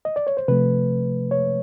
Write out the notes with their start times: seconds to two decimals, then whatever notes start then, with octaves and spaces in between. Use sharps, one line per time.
0.05 D#5
0.16 D5
0.27 C#5
0.37 C5
0.48 C3 F3 A3 B4
1.31 C#5